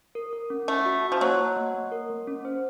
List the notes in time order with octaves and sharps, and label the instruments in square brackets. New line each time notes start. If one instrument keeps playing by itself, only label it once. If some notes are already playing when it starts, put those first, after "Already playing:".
[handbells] A#4
A#4
C#4
[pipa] A3 [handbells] C#4
[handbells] F#4
F#4
[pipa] F3
[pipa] F#3 [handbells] A#3
[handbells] A#3
A#3
A#3
A#4
A#3
C#4
C5